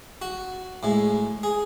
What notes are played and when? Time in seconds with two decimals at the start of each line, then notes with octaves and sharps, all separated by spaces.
0.22 F#4
0.83 A2 G#3
1.43 G#4